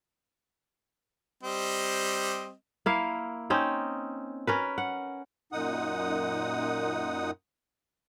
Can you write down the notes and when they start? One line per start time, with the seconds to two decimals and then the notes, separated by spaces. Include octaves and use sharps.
1.43 G3 C4 D#5
2.86 A#3 E4 F5
3.50 C4 C#4 D#4
4.47 C#4 A#4 B4
4.78 F#5
5.52 F#2 A#2 D#4 F#5 D#6